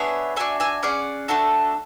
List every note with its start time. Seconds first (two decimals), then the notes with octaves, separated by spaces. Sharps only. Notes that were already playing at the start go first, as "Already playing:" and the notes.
Already playing: B3 D4 G#4 C#5 E5
0.36 D4 F#4 A4 E5 G#5
0.60 E5 G#5
0.83 C#4 G#4 D5 F#5
1.28 A3 D4 F#4 A4